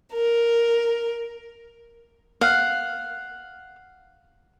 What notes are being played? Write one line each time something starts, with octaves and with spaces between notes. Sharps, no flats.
A#4
F5 F#5